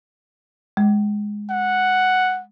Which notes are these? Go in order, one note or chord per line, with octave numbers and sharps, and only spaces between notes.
G#3
F#5